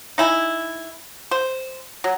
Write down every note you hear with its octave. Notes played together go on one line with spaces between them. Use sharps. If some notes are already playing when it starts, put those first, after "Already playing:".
D#4 E4 G#5
C5
F#3